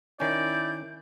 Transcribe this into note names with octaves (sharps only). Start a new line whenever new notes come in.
D#3 C#4 E4 D5 G6